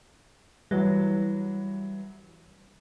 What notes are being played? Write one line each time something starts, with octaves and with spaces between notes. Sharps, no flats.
E3 F#3 G3